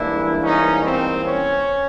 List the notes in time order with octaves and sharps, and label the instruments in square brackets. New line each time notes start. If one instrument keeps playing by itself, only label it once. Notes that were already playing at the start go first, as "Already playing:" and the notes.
Already playing: [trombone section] G#2 E3 G3 A#3 D4 E4
C#4 D#4
C4
C#4